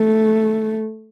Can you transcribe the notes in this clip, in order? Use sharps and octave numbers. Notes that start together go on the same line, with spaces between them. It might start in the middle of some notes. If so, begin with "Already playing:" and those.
Already playing: A3